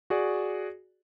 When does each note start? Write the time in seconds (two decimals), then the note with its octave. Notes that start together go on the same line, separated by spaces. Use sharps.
0.10 F#4 G#4 D5